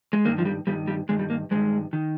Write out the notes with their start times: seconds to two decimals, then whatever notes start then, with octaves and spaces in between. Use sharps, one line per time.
0.13 G#3
0.25 G2 D#3 A#3
0.38 F3
0.45 G3
0.67 G2 D#3 G3
0.88 G3
1.09 G2 D#3 G#3
1.19 G3
1.30 A#3
1.51 G2 D#3 G#3
1.93 D#3